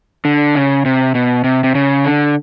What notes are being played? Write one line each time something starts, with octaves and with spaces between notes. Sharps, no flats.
D3
C#3
C3
B2
C3
C3
C#3
D3